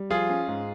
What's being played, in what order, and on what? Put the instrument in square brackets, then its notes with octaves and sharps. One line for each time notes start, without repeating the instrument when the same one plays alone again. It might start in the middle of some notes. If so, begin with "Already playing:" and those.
Already playing: [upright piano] G3
[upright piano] F3 [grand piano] F4 G#4
[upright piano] C#4
G#2